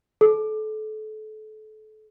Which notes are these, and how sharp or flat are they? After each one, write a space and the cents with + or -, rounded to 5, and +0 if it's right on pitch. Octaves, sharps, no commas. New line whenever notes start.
A4 -30